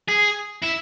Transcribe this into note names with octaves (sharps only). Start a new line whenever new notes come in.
G#4
E4